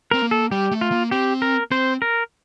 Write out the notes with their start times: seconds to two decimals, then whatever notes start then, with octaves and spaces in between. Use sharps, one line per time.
0.11 C4 A#4
0.22 A#3
0.31 A4
0.51 G3 G4
0.71 A3
0.81 F4
0.92 A#3
1.11 C4 G4
1.42 A#4
1.71 C4 C5
2.02 A#4